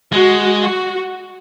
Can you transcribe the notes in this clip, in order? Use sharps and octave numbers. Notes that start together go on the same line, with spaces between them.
G#3 F#4
F#4